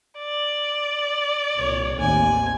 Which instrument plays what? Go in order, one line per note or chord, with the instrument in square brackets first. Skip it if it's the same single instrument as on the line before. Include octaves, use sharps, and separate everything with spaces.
[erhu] D5
[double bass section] C2 A#2 [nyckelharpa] C#5
[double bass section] A1 D#2 C4 [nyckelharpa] G#5